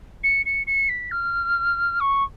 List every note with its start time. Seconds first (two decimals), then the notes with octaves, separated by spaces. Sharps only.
0.23 C#7
0.46 C#7
0.67 C#7
0.89 B6
1.11 F6
2.00 C#6